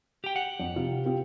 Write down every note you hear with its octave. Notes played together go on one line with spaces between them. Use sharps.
G4 G5
F#5
F2
C3 F4 G4
C4 F4 G4